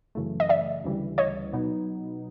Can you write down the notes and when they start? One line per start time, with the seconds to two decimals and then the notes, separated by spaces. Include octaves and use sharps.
0.15 F#2 C#3 E3 A3
0.40 D#5
0.49 D5 E5
0.84 D2 C#3 E3 G3
1.18 C#5 D#5
1.53 B2 F#3 B3 D#4